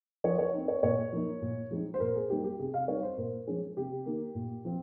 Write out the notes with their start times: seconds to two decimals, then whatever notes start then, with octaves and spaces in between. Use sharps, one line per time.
0.24 F3 C#5
0.38 C#5
0.53 C4 D#4
0.68 C#5
0.83 A#2 C#5
1.12 F3 A#3 D#4
1.42 A#2
1.71 F3 G#3 C4 D#4
1.94 C5
2.00 A#2 A#4
2.15 G#4
2.30 G3 A#3 D#4 G4
2.44 G4
2.59 C3 G#4
2.74 F5
2.88 G3 C4 D#4 C#5
3.03 C5
3.18 A#2 A#4
3.47 F3 G#3 C#4 G#4
3.77 C3 G4
4.06 D#3 A#3 D#4
4.35 A#2
4.65 F3 C4